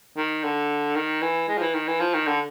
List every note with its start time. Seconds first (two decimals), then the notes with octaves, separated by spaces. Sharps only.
0.17 D#3
0.43 D3
0.95 D#3
1.22 E3
1.49 G#3
1.58 F3
1.61 E3
1.74 D#3
1.87 E3
2.00 F3
2.13 D#3
2.26 D3